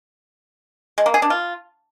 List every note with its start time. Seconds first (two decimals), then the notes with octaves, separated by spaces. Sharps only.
0.98 G#3
1.06 A#3
1.14 G#4
1.22 D4
1.30 F4